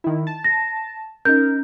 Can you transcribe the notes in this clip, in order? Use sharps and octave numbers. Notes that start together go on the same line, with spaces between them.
D#3 E4
A5
A#6
C#4 D#4 A#4 G6